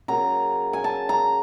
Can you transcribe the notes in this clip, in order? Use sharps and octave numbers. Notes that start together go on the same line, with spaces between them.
C#3 F#3 A#3 A#5
G#5
A5
A#5